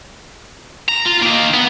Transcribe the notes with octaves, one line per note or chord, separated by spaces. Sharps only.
A#5
F4
D#3 A#3
B3